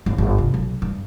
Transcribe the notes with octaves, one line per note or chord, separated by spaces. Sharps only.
G1
G1
C3
B1
G2